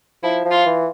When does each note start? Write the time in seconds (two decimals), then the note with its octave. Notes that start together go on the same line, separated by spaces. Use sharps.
0.23 F3 E4
0.45 F3
0.51 F4
0.66 E3